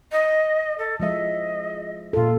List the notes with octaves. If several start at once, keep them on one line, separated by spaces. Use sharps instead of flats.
D#5
A4
F3 G#3 D#5 E5
A#2 F4 A4